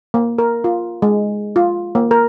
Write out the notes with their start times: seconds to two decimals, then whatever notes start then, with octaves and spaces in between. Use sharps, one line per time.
0.14 A#3
0.38 A#4
0.64 F4
1.02 G#3
1.56 F4
1.95 A#3
2.11 A#4